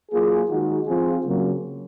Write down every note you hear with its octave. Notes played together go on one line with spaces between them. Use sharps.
F#3 A#3 F4 G#4
D#3 G#3 D#4 F#4
F3 C4 F4 G#4
C#3 F#3 A#3